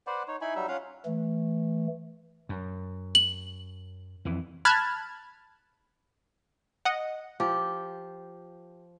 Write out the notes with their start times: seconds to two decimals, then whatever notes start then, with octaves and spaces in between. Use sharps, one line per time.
0.07 B4 C5 D5 F#5
0.28 D#4 C#5
0.41 D#4 E4 G#5 B5
0.55 F#3 G3 D#4 E5
0.68 C#4 F4 F5 F#5
1.05 E3 A3
2.49 F#2
3.15 F#7
4.25 F2 E3
4.65 A5 B5 F6 F#6 G#6 A6
6.85 D#5 F#5
7.40 F3 G4